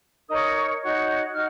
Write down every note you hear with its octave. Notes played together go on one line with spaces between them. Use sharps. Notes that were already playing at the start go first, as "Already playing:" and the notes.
D#4 A#4 C#5 D#6
D#4 F#4 C#5
D#4 F#4 F6